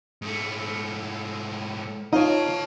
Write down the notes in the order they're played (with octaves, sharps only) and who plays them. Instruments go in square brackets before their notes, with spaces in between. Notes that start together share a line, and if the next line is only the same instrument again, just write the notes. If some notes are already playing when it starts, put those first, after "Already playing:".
[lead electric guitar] G#2 A3
[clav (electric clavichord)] D#4 [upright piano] F4 C#5 [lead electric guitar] D#5 A5